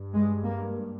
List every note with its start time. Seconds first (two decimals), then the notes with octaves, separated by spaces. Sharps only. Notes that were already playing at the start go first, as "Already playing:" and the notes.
Already playing: G2
0.14 G#3
0.44 A#3